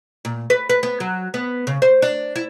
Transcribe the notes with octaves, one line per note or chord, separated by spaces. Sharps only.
A#2
B4
B4
B3
F#3
B3
C#3
C5
D4
E4